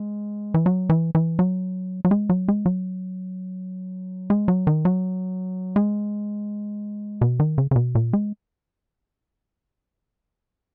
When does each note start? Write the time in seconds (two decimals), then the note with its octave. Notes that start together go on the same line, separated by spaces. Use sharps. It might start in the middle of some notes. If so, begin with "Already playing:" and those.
Already playing: G#3
0.54 E3
0.66 F#3
0.89 E3
1.15 E3
1.39 F#3
2.05 F#3
2.11 G#3
2.29 F#3
2.48 G#3
2.66 F#3
4.30 G#3
4.48 F#3
4.67 D#3
4.85 F#3
5.76 G#3
7.21 B2
7.40 D#3
7.58 C#3
7.71 C#3
7.76 B2
7.95 A#2
8.13 G#3